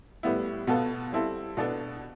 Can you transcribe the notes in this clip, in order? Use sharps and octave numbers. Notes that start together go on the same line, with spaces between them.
A2 G3 B3 E4
B2 B3 F4 A4
G3 C4 E4 A4
B2 B3 D4 A4